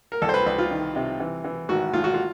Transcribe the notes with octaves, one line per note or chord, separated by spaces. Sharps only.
A#4
C2 A4
C5
B4
C2 B4
F4
D#3
C3
E3
E3
G#1 F#4
G#1 F4
F#4
F4